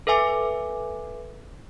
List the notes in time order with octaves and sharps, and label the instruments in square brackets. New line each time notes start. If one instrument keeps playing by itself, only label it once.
[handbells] A4 B4 E5 G#5 D6